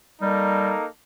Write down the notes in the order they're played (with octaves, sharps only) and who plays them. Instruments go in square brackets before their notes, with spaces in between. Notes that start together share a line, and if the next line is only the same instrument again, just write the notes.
[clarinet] G3 [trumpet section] A#3 D#4 A4